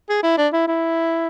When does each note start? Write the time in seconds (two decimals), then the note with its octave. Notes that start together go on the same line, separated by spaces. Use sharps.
0.09 G#4
0.23 E4
0.38 D4
0.53 E4
0.68 E4